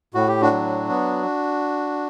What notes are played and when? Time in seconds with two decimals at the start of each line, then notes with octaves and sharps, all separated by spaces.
0.14 A2 F#4
0.28 G4
0.41 D4 F#4
0.52 F#3
0.89 B3